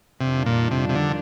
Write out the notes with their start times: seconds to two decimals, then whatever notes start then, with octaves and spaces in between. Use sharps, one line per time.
0.21 F2 C3 D#3 G3 D4 F4
0.46 A#2
0.71 C3
0.89 C3
0.95 D3